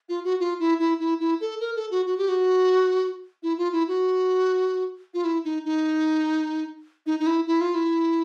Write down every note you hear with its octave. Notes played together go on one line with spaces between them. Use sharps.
F4
F#4
F4
E4
E4
E4
E4
A4
A#4
A4
F#4
F#4
G4
F#4
E4
F4
E4
F#4
F4
E4
D#4
D#4
D#4
D#4
E4
E4
F4
E4